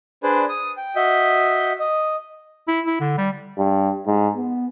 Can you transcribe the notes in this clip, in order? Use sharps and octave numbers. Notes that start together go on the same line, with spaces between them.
D4 G#4 B4 C5 D5
D#6
G5
F#4 D#5 E5 G6
D#5
E4
E4
D3
G3
G2
G#2
B3